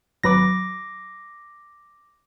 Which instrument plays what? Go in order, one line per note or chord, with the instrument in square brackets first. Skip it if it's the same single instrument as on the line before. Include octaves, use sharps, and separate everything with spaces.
[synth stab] G#1 F#3 B4 [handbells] D6 A#6